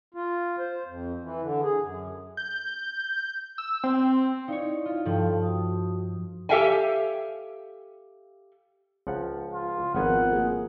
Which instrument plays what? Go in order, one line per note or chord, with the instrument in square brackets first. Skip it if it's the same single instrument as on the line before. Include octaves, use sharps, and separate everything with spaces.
[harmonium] F4
C5
F2
E3
D3
G#4
F#2
[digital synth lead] G6
E6
C4
[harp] D#4 C#5 [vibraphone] E4 D5 F5
[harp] F4
[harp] G2 F3 [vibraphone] A4 G5 A5
[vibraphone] F#4 D#6
[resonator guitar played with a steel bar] G4 A4 E5 F5 G5 G#5
[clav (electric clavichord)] C#2 F3 F#5
[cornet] F4
[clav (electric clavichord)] G#1 B3 G#5 [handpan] F3 G#3 A#4 [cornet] F#5
[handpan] A#3 G#4